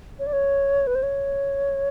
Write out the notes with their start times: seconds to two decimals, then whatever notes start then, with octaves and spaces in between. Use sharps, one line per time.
0.19 C#5
0.27 D5
0.33 C#5
0.87 B4
0.95 C5
1.03 C#5